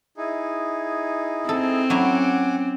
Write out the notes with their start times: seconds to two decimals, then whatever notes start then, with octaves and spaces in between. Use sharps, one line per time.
0.17 D#4 E4 G#4
1.49 C4 A4
1.90 F#3 C#4 E4 F#5 G#5 D6